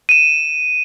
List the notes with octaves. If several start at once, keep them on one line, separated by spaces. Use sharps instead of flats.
D#7 E7